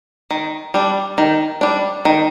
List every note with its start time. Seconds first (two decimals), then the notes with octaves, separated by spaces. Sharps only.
0.31 D#3
0.74 G3 D4
1.18 D#3
1.61 G3 D4
2.05 D#3